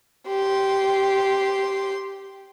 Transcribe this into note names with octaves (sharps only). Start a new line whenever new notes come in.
G4 C6